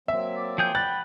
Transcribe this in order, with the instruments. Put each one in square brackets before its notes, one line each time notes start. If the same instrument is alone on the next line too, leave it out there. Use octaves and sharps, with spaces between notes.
[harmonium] F#3 A#3 C4 [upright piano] E5
[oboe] D5
[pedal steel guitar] F3 G#4 G6 [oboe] G5
[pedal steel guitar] F#5 B5 [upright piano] F#6 A6